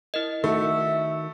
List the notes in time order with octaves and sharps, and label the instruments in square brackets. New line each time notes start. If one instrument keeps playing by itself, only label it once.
[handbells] E4 A#4 D#5
[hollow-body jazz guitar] D#3 F#4 [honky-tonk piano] A3 [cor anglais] E5